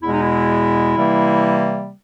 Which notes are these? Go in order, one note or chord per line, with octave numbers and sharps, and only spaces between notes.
E2 B2 G#3 E4
D#4
E4
C3 E3 G3 A#3